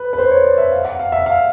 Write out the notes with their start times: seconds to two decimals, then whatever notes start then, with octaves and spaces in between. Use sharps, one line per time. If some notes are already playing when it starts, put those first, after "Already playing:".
Already playing: B4
0.13 B4
0.18 C5
0.31 C#5
0.44 D5
0.58 E5
0.72 F5
0.85 F#5
0.99 F5
1.12 E5
1.26 F5